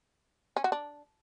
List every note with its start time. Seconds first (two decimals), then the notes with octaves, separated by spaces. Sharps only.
0.57 C#4
0.64 F#4
0.72 D4